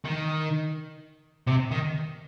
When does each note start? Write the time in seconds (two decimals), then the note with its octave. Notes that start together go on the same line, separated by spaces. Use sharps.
0.05 D#3
1.47 C3
1.71 D#3